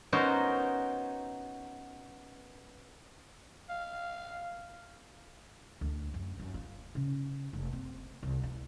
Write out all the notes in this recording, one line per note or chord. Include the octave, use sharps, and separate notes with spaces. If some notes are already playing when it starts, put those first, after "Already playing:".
B3 C#4 D#4 F#4 A#4 C5
F5
D2
F#2
F#2
F4
C#3
F1
C4
C2
E4